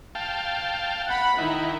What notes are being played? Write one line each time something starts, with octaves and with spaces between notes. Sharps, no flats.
F5 G5 A5
F#5 B5
D#3 D#4 E4